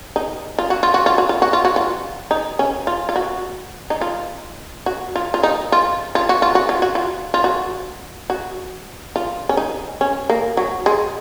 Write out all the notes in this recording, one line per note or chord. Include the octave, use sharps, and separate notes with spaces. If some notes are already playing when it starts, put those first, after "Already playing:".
D#4
F4
F#4
F4
F#4
F4
F#4
F4
F#4
F4
F#4
F4
D#4
C#4
F4
F4
F#4
D#4
F4
F#4
F4
F4
D#4
F4
F4
F#4
F4
F#4
F4
F#4
F4
F4
F#4
F#4
F4
C#4
D#4
C#4
A#3
F#3
G#3